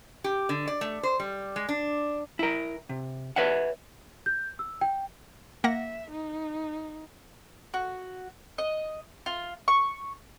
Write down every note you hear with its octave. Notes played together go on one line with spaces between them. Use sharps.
G4
D3
D5
A3
C5
G3
G#3
D4
E4 A#4
C3
B4 C#5 E5 F#5
G6
E6
G5
A#3 E5 F#5 A#6
D#4
F#4
D#5
F4
C#6